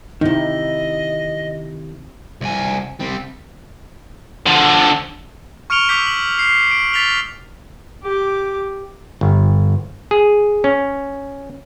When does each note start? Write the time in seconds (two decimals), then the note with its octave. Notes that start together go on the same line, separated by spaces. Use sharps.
0.21 C3 D#3 D#4 E4 D#5
2.41 C2 G#5
3.00 G3 C4
4.46 D3 F3
5.70 C#6 F6 C#7 D7 F7 G7
5.89 D6 E6 G6 B6 F7
6.07 F#7
6.39 C7
6.71 D7
6.93 A6 B6 F7 G7
8.03 G4 D6
9.21 G1
10.11 G#4
10.64 C#4